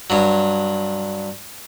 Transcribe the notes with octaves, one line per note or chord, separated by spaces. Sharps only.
G2 F#3